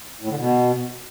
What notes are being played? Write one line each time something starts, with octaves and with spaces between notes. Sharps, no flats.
A2
D3
B2